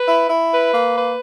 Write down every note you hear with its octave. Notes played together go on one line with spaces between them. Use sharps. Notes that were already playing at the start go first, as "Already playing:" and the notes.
Already playing: B4
E4
E4
B4
A#3
B4